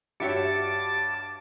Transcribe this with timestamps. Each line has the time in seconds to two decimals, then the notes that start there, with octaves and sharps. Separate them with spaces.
0.20 G2 F#4 G4 C#5 E5 A5 D6 C#7